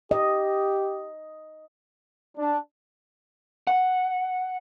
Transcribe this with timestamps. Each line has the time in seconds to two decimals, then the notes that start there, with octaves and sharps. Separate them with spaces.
0.11 G4 D#5
2.37 D4
3.67 F#5